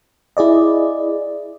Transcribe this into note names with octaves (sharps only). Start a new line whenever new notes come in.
E4 G#4 D5 D#5